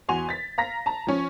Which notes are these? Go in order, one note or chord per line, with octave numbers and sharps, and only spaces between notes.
E2 F#4 G#5 C6 F7
A6 B6
F5 A#5 A#6 B6
A5 A#5
F3 C#4